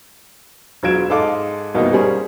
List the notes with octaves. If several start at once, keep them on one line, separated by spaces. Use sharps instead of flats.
E1 F#3 F4 G#6 D7 E7
G#2 G#3 A4 F5 D6
C2 B2 E3 A#3 D#4 G4
G3 C#4 G#4 A#4 C5